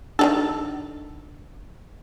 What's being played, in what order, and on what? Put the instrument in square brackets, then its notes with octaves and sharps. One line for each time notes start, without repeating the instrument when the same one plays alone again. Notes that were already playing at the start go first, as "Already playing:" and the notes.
[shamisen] D#3 G3 A4 [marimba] D4